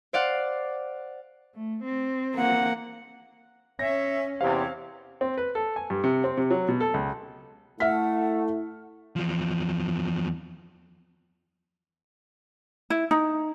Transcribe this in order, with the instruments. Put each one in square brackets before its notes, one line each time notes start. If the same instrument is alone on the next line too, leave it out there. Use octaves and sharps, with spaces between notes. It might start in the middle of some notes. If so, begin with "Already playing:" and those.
[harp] C5 D5 F5 F#5
[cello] A3
C4
[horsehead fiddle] A#3 F#5
[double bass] C#4 [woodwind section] C#5 E5 [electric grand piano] A#6
[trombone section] E2 C3 [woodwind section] C4 G4 C#5 [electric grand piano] C5 F5
[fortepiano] C4
B4
A4
G#5
G2
C3
C4
C3
F#3
B2
A4
C#2
[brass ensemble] A3 [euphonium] E4 [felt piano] E5 F6 B6 [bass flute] F#5
[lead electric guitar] E2 F3
[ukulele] E4
D#4